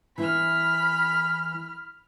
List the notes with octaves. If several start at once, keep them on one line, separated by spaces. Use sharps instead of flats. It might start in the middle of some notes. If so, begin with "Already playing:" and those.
E3 E4 B5 F6